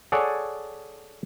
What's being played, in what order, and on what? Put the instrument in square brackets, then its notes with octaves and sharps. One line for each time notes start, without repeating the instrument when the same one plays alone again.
[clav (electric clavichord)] G#4 A4 C#5 D5 F#5 G#5